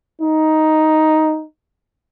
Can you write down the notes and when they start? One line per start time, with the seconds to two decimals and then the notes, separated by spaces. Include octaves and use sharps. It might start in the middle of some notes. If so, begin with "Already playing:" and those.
0.22 D#4